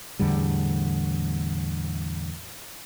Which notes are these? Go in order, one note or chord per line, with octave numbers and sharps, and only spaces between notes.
E2 A2 D3 G3